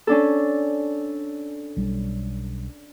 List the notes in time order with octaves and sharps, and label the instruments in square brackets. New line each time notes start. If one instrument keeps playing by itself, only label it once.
[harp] C#4 D4 A4
[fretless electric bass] B1 G3